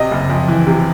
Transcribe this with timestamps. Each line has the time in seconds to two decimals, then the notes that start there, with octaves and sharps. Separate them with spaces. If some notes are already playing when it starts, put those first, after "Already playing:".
Already playing: C3 D#5
0.11 F#1
0.30 F2
0.48 E3
0.67 C3